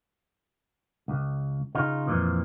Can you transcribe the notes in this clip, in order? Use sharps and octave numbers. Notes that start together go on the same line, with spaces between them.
C#2
C#3 D#4 F4
F2 A#2 E3 F3